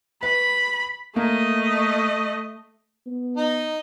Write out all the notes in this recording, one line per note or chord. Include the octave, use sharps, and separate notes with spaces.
B4 B5
A3 A#3 D#5
B3
D#4